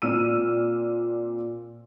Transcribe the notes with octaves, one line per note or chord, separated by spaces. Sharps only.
A#2 C4 E6 F6 D#7